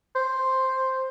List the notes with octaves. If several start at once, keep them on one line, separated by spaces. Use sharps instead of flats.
C5